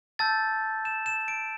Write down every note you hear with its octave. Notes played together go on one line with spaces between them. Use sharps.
A5 E6 G6 A6
E7
E7
D7